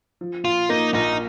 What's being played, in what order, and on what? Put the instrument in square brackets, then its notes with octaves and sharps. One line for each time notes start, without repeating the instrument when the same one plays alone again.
[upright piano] F3
[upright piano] A#2 [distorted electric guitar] F4
[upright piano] A#3 [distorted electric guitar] D#4
[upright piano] A#1 [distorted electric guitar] D#4